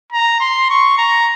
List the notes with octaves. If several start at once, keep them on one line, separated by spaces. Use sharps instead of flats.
A#5
C6
C#6
A#5